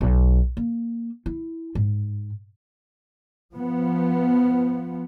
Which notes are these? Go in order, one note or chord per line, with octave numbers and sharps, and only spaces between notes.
B1
A#3
E4
G#2
F3 B3